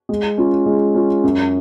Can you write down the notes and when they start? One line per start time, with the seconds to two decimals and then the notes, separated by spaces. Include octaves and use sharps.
0.09 G#3
0.38 C#4 F4
0.66 G#3
0.95 C#4 F4
1.24 F#2